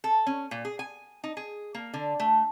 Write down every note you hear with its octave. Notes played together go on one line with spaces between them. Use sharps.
A4
C#4
A#2
G#4
G#5
D#4
G#4
A#3
D3
A3